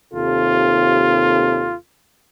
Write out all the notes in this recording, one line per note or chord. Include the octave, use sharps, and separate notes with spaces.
D#2 C3 F4 A4